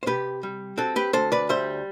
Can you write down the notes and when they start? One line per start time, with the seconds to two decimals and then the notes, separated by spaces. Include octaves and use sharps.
0.03 C5
0.06 C3 G4 B4
0.43 G3
0.77 C4 F#4 A4
0.96 G4 B4
1.13 D2 A4 C5
1.32 B4 D5
1.49 G3 C5 E5